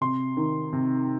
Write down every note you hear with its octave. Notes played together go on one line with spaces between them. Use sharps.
C3 C6
D#3
C3